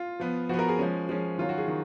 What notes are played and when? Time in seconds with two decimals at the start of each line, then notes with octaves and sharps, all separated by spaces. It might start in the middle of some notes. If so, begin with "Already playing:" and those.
Already playing: F4
0.20 F3 B3
0.49 F3 F#4
0.54 B3
0.59 A#4
0.69 G#4
0.79 F3 G#3 C#4
1.09 F3 G#3 C#4
1.38 D#3 F#3 C#4 F4
1.49 F#4
1.58 G#4
1.68 D#3